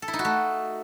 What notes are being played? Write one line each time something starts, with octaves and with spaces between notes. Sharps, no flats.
A4
E4
D#4
F#4
A3